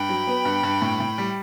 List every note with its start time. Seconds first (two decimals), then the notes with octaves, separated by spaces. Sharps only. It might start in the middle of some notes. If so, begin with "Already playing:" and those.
Already playing: G2 G5 B5
0.09 F#3
0.27 B3
0.45 G2
0.63 G2
0.82 A2
1.00 A2
1.18 G3